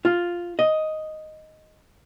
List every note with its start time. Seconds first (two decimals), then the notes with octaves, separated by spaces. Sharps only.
0.05 F4
0.59 D#5